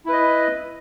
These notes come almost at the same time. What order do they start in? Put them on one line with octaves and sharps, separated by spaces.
E4 B4 D#5